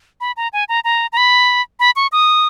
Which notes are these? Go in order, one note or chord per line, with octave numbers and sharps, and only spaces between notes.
B5
A#5
G#5
A#5
A#5
A#5
B5
B5
C#6
D#6